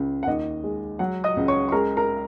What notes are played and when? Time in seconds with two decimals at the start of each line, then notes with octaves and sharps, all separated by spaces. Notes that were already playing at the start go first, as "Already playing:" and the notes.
Already playing: C#2 C#3
0.23 F#5
0.27 D#2 D#5
0.64 G#3
0.99 F#3 F#5
1.24 D#5 D#6
1.37 C#2
1.48 C#5 C#6
1.69 C#6
1.72 G#3 A#4 A#5
1.97 A#4 A#5